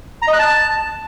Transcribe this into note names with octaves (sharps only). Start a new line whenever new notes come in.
A#5
D#5
F#6
A5